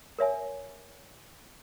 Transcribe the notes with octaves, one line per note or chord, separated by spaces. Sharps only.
A#4 C#5 E5 G#5